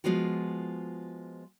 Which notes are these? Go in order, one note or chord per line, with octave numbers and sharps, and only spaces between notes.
F3 G#3 B3 F4 F#4